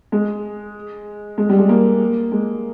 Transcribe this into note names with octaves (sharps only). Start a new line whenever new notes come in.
G#3
G#3
G3
G#3
A#3
G#3